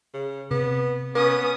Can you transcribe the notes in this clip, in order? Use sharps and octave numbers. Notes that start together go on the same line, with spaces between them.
C#3
C3 B3
B3 C#4 D#6